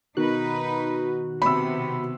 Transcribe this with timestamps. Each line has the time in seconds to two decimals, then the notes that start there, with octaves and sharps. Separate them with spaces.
0.17 B2 D#3 D#4 F#4 B4 F#6
1.42 C3 B3 B5 E6